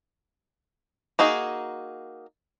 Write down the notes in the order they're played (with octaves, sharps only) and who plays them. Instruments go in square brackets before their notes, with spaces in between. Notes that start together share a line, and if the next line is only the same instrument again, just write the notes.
[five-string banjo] A#3 D#4 F#4 G#4